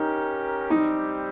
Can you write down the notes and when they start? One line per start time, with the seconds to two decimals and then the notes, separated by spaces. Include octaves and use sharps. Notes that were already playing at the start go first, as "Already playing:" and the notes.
Already playing: C#4 D#4 G4 A#4
0.70 G3 C4 D#4 G4